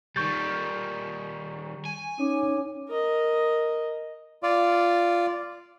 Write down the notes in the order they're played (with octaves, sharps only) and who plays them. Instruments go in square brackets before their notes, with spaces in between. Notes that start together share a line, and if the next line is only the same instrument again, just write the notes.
[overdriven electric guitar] D#3 G3 [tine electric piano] C#6 G6 A6
[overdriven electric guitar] G#5
[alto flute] C#4 [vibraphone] D#4 C#5 D6
[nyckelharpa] A#4 D#5
[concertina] F4 D5